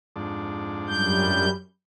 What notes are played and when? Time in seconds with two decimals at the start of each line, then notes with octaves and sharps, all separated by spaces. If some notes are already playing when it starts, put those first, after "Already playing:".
0.16 F2 G#2 D4
0.87 F#2 G3 G6